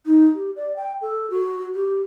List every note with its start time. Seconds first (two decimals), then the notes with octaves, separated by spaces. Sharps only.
0.06 D#4
0.35 G4
0.56 D5
0.76 G5
1.01 A4
1.30 F#4
1.74 G4